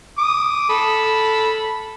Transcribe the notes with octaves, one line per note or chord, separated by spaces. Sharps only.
D6 D#6
A4 B5